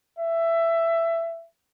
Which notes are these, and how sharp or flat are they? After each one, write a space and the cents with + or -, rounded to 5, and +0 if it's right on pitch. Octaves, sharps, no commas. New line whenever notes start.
E5 +15